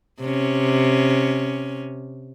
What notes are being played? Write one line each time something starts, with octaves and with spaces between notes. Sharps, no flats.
C3 C#4